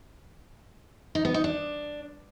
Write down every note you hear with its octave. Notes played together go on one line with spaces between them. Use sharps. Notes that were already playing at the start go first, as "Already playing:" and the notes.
D#4
B3
D#4
D4